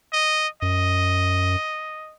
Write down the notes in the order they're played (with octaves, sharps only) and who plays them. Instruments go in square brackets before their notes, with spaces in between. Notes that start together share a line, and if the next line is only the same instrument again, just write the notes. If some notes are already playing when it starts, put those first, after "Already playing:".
[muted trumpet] D#5
[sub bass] F#2 [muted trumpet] D#5